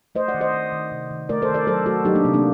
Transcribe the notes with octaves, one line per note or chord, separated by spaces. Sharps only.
A3 C5 D#5
D5 F#5
D#3
C5 D#5
D#3
D#3
C3
D#3
A3 A#4 D5
A4 C5
D#3
A#4 D5
F#3 A4 C5
A3 F#4 A4
F#3 D#4 G4
A#3 D4
C3 C4
A#3 D4